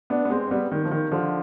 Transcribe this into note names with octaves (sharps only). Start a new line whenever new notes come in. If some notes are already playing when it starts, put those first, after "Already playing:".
B3 D4
B3
G#3 C4
C4
G3 B3
D#3
F3
D#3
D3 F3